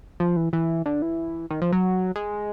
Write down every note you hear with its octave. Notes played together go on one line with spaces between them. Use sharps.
F3
E3
E3
D3
E3
D#3
F3
F#3
G#3